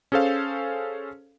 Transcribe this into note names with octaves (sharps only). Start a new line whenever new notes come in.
C#4 G#4 A4 C5 F5